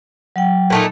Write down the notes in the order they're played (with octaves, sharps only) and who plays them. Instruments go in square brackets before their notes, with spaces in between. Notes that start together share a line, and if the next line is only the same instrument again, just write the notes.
[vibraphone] F#3 F#5 G5
[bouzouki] A#2 A3 D#4